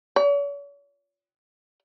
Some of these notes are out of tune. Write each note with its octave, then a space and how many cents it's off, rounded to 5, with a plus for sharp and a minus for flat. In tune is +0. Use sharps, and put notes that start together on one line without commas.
C#5 +45